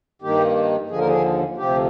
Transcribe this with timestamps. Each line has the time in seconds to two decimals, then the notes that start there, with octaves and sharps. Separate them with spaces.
0.22 G2 D#3 A#3 G4
0.89 D#2 D3 F3 G#4
0.99 A#4
1.07 G#4
1.57 D2 C3 F3 G4